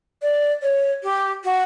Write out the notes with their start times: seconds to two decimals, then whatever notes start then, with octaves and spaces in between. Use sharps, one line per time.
0.22 D5
0.62 C#5
1.03 G4
1.44 F#4